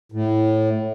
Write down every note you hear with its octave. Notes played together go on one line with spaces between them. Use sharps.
A2